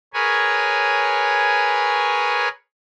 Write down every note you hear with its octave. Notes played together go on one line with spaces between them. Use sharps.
G#4 A#4 B4 C#5 G#5